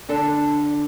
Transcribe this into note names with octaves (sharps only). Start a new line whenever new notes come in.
D3 D4 A4 A5